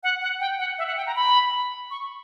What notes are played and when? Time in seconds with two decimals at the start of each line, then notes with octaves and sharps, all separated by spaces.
0.03 F#5
0.22 F#5
0.40 G5
0.59 F#5
0.78 E5
0.87 F#5
0.97 G5
1.07 A#5
1.16 B5
1.91 C#6